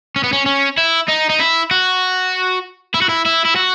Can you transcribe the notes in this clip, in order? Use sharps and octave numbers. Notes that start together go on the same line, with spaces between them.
C#4
B3
C#4
C#4
E4
D#4
D#4
E4
F#4
E4
F#4
E4
E4
E4
F#4